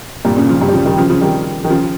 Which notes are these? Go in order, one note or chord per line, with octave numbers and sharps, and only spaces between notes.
G2 A#2
A#2 C#3
C#3 F3
G2
G3
C#3 F3
D#3 G3
C#3 F3
C#3 F3
D#3 G3
D#3
C#3 F3